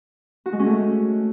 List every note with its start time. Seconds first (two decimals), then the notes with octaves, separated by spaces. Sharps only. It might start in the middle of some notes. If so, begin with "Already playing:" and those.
0.46 F#4
0.53 G#3
0.59 C#4
0.66 A3